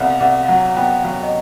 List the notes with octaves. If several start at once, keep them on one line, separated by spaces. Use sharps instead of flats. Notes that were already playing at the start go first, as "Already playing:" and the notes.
Already playing: C2 B3 F5 F#5
F5
C2 F#5
F5
F#3 F#5
B3 G5
F#3 F5
D#5